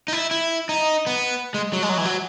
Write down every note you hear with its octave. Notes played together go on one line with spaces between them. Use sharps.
D#4
E4
E4
D#4
B3
G#3
F#3
G#3
F#3
E3
F#3